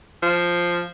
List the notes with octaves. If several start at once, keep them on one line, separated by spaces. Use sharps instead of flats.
F3